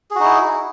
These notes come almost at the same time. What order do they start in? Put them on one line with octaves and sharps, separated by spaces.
G#4 F#4 D#4 E4